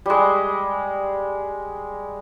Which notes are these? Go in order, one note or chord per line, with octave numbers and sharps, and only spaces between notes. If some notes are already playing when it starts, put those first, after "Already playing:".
G3 G#3